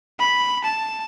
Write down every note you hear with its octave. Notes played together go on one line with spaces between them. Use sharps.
B5
A5